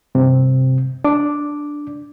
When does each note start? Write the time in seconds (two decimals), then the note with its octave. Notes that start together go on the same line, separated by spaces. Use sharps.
0.15 G2 C3 C4
1.04 D4 D6